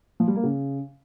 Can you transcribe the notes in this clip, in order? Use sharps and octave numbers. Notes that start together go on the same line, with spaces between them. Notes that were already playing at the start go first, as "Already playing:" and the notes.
F3
G3
A#3
C#3